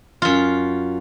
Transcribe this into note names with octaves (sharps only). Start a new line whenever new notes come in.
F#2 F4